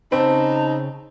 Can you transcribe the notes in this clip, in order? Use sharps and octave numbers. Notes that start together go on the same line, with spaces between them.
C#3 C4 C#4 D#4 A5 B5